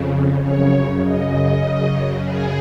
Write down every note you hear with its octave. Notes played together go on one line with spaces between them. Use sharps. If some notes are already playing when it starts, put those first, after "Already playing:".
Already playing: F2 C#3
F#2 C#3 C#5
D#5
F#2 C#3
G#4